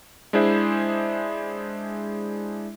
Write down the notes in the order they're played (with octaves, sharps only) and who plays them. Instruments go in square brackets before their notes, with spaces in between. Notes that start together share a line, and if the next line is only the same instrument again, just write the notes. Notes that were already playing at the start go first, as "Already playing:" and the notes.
[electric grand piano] G#3 D4 E4 G#4 C5 E5